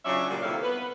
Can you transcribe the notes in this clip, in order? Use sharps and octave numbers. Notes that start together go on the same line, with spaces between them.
C#3 F#3 C#4 D4 F4 E5
A#2 C#3 F#3 G3
C3 D#3 A#3 E4 A4 F5
B3 B4